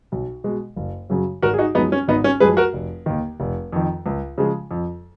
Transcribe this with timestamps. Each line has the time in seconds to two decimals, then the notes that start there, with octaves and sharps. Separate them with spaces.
0.12 B1
0.44 B2 G#3
0.76 F#1
1.10 F#2 C#3 F#3
1.42 G#1 F#4 A#4
1.54 G#4
1.58 D#4 F#4
1.75 F#2 F3 G#3 B3 D#4
1.92 C#4
2.08 G#1 B3 D#4
2.24 C#4
2.40 F#2 F3 G#3 G#4 B4
2.57 F#4 A#4
2.73 F1
3.06 D#2 D#3
3.40 F1
3.72 F2 D#3
4.06 C#2
4.38 C#3 F3 G#3
4.71 F2